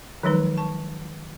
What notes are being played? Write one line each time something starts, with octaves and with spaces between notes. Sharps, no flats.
D#3 F3 F#3 G#3 D#4 B4
A5 C#6